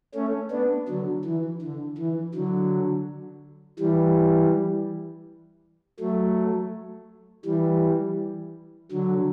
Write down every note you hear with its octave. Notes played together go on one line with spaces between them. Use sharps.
A3 C#4
B3 D4
D3 F#3
E3
D3
E3
D3 F#3
E3 G3
F#3 A3
E3 G3
D3 F#3